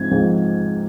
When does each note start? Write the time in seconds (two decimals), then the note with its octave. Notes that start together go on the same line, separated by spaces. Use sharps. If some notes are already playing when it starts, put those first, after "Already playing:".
Already playing: G#2 F3 C4 G#6
0.11 G#2 F3 C4